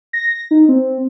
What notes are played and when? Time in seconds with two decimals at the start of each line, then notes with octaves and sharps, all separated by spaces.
0.13 A#6
0.51 D#4
0.68 C4